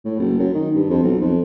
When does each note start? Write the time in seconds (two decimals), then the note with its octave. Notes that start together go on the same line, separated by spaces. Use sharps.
0.05 A2
0.19 F#1
0.39 F#2
0.54 D#3
0.75 G2
0.90 F2
1.03 B1
1.21 F2